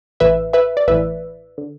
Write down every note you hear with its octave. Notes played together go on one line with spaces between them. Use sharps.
A1 A2 E3 B4 E5
B4 E5
D5
A1 A2 E3 B4 E5
D3